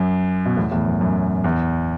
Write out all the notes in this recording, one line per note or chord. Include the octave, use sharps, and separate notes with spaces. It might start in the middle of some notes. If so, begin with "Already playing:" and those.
Already playing: F#2
B2
E2 A2
E2 A2
F#2
F#2
E2